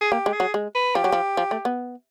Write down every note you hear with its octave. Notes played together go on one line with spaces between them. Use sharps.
G#4
A#3 G4
G#3
G#4
F#3
G#3
B4
F3 G4
F#3
F3
F3
A3
B3